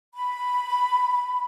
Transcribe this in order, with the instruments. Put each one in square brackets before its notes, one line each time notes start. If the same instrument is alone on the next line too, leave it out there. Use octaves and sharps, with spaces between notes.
[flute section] B5